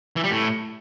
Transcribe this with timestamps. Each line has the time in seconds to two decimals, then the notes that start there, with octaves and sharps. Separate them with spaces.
0.16 E3
0.24 G3
0.31 A2